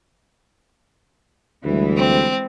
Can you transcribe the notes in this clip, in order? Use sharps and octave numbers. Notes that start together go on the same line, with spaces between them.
D2 E3 G3 G#3
C4